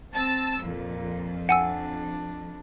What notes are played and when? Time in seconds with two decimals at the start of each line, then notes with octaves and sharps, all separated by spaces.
0.13 C4 A5 E6
0.62 F2 A#2
1.49 D4 F#5 G#5 E6